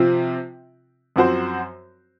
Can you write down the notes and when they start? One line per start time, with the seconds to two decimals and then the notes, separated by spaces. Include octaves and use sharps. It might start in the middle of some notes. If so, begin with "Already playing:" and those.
Already playing: C3 F3 C4 F4
1.16 F#2 F3 C4 F#4 C5